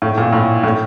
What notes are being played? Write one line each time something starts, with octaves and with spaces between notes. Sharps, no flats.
A2
A#2
A2
A2